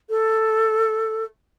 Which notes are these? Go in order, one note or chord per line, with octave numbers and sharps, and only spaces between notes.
A4